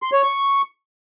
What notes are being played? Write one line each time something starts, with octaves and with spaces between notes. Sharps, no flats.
C6
C#5
C#6